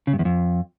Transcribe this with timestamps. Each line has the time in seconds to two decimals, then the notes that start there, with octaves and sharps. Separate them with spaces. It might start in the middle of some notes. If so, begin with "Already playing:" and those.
0.07 C#3
0.13 G2
0.19 E2
0.25 F2